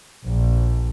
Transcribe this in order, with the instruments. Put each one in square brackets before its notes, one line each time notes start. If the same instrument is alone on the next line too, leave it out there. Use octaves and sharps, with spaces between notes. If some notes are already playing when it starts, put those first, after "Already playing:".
[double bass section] A#1